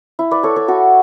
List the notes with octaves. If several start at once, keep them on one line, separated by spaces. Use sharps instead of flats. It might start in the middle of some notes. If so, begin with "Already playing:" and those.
E4
B4 D5
A4 C#5
A4 C#5
F#4 A4